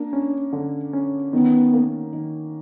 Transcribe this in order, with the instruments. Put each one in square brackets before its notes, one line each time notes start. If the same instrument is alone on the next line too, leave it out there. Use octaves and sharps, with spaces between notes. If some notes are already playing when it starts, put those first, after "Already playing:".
Already playing: [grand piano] A#3 [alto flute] D4
[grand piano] C#4
D3
C#4
[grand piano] D#3 [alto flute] B3
[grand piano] A#3
D#3